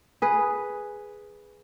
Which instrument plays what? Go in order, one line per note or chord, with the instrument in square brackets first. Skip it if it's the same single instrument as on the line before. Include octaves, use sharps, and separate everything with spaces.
[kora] G#4 B4